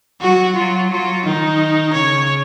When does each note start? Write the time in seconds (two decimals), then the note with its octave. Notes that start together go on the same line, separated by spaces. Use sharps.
0.22 F#3 F#4
0.56 F#3 F4
0.91 F#3 F4
1.25 D#3 D#4
1.93 C#3 C#5